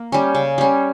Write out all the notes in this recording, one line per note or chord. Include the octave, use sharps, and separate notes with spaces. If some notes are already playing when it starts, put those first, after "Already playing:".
Already playing: A#3
G3 C#4
C#3
G3 C#4